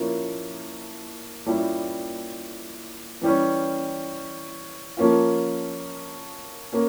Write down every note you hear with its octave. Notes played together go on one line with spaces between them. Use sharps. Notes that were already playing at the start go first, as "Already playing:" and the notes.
Already playing: A#2 F3 A#3 C#4 E4
A#2 G3 C#4 E4
E3 G3 C#4
F3 A#3 C#4 F4
A#3 C#4